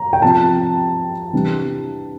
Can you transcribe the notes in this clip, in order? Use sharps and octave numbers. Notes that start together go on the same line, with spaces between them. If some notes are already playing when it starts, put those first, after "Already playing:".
Already playing: A#5
G5
C3 F3 C4 A5
C3 E3 G3 D4